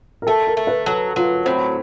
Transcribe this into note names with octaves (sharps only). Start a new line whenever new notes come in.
A#4
A3 A4
A#4
A3
B4
F#3 A4
F#3 F4
A2 C4